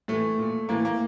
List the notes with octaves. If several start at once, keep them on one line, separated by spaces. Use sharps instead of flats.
A2 E3 A3
A#2
A2 E3 A#3
A#3